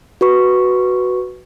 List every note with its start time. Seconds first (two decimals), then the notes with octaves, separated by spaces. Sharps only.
0.21 F#4 B4 C#6